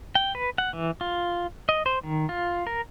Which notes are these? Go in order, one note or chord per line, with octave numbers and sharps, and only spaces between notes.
G5
B4
F#5
E3
F4
D#5
C5
D#3
F4
A#4